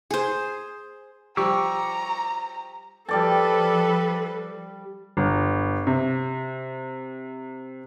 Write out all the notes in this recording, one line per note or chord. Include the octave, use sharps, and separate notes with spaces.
G#4 C5
F3 G3 G4 A#5 C#6 D6 E6
F3 G3 A4 B4 D5 A5
G1
C3